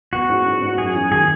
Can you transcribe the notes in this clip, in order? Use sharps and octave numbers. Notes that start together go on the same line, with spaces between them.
B3 F#4
G#2
G#2
G#2
F#2 G#4
F#3
D#3 G#4